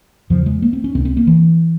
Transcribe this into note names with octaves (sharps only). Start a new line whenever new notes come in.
E2 C#3 F3
G#3
A#3
C4
C#4
C#2 C3 C4
C4
A#3
E3